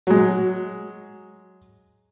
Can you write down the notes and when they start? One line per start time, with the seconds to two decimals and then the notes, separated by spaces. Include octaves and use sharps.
0.07 F#3 G#3